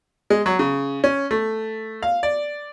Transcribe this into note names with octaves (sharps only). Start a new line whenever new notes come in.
G#3
F#3
C#3
C#4
A3
F5
D5